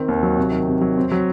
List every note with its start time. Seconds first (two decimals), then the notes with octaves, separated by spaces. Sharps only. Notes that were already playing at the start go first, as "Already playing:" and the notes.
Already playing: D#3 C4
0.08 D#2
0.23 F#3
0.38 C3
0.52 D#3
0.67 C3
0.81 F#3
0.97 C4
1.12 F#3